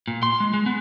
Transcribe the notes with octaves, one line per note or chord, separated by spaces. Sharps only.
A#2
C6
G#3
G#3
B3